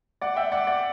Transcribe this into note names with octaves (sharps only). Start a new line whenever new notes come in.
D5 F#5
E5 G5
D5 F#5
D5 F#5